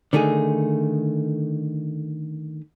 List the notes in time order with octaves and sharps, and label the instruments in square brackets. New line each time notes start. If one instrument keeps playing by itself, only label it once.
[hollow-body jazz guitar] D3 D#3 A3 D#4 G#4